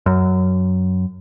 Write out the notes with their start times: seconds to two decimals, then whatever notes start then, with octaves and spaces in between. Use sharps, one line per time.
0.06 F#2